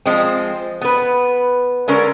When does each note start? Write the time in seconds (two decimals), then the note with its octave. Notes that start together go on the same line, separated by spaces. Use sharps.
0.06 F3 G#3 C4
0.81 B3 B4
1.88 D3 G#3 C#4 A#4